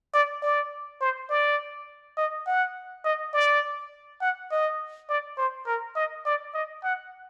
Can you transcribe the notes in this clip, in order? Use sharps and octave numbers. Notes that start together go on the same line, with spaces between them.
D5
D5
C5
D5
D#5
F#5
D#5
D5
F#5
D#5
D5
C5
A#4
D#5
D5
D#5
F#5